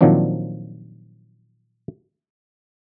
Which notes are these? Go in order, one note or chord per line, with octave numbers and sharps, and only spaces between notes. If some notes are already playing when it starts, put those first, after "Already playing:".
A#2 D#3 F3 F#3 C4 D4